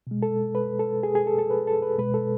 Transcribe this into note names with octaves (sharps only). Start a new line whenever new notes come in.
B2 G#3
A4
B4
A4
G#4
G#4
A4
A4
B4
A4
B4
B2 G#3 B4
A4